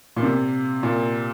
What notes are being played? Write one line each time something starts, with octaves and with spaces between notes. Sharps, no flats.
A#2
C3
A#2